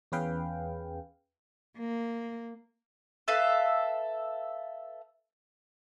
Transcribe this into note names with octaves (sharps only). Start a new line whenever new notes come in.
E2 C#4 G#4 B4 F5 G5
A#3
A4 B4 E5 F5